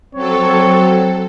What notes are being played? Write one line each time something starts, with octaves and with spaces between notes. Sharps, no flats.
F#3 C4 A4 C#5